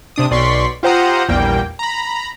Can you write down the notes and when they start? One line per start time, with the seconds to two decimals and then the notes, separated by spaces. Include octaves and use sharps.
0.16 C3 D4 D#6
0.31 B1 D5 C6 C#6 B6
0.83 F4 G4 C5 F#5 A#5 D#6
1.29 A#1 E2 G3 A#3 G5
1.79 A#5 B5